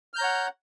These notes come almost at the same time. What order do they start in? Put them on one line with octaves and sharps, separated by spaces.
F6 G6 A#5 C#5 F#5